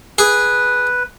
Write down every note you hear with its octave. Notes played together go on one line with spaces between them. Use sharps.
G#4 B4